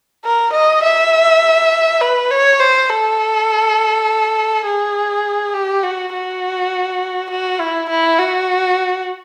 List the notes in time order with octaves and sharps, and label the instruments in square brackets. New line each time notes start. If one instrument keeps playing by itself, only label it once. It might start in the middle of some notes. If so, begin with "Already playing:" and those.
[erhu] A#4
D#5
E5
B4
C#5
C5
A4
G#4
G4
F#4
F#4
F#4
E4
E4
F#4